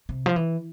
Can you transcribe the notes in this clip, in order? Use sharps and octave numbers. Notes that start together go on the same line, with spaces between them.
C3
F3
E3